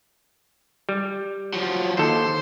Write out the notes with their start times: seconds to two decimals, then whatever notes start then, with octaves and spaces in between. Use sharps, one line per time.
0.89 G3
1.53 F3 F#3
1.98 D#2 A4 C5